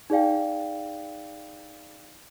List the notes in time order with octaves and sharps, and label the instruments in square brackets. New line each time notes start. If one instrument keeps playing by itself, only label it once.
[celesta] D#4 G#4 D5 F5 G5